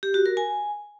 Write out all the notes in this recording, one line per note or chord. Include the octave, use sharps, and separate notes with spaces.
G4
F#4
A#4
G#5